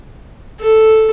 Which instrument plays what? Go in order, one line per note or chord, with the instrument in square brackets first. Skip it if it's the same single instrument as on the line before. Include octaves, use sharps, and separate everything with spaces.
[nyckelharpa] A4